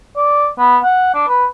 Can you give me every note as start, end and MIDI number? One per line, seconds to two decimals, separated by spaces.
0.17 0.48 74
0.58 0.78 59
0.83 1.13 78
1.14 1.25 62
1.28 1.46 71